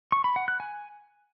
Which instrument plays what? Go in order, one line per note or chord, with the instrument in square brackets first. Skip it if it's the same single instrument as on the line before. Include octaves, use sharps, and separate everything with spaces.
[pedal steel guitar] C#6
B5
F#5
F#6
G#5